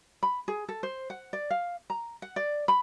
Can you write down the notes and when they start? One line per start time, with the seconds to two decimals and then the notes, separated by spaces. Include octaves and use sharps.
0.23 B5
0.48 G#4
0.69 A4
0.83 C5
1.10 F#5
1.33 D5
1.50 F5
1.90 A#5
2.22 F#5
2.36 D5
2.68 B5